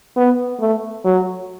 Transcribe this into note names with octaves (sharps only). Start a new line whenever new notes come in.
B3
A3
F#3